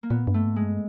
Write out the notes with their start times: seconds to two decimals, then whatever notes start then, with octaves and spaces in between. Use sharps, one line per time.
0.03 A#3
0.10 A#2 B3
0.27 G2
0.34 A3
0.45 G#2
0.56 G#3
0.63 G2